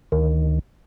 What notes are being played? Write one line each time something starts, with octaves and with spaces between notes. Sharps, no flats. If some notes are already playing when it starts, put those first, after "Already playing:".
D2 D#3